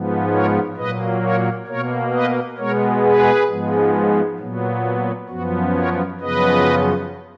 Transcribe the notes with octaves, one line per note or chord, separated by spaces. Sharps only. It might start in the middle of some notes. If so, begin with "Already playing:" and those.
Already playing: G#2 F3 B3
A#4 C#5
A#2 F#3 A#3 B4 D#5
A#4 C#5
B2 A#3 A#4 C#5
B4 D#5
B2 G#3 B3 A#4 C#5
G#4 B4
G#2 F3 G#3 B3
A#2 F#3 B3
F#2 F3 B3 F#4
A#4 C#5
F#2 C#3 F3 B3 B4 D#5